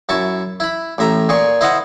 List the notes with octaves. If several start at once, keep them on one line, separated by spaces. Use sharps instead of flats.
F#2 E4 A5 C#6
E4 B5
A1 A2 E5 A#5
A#2 G#4 G#5 C#6
E4 C5 D#5 F5 F#5